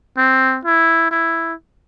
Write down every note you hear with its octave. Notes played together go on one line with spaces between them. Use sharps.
C4
E4
E4